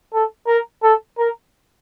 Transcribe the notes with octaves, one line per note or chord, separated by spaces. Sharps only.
A4
A#4
A4
A#4